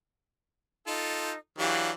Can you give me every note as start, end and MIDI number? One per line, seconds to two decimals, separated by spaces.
0.87 1.38 63
0.87 1.31 65
0.87 1.31 69
1.58 1.91 52
1.58 1.91 54
1.58 1.91 62
1.58 1.90 67
1.58 1.90 77
1.58 1.90 85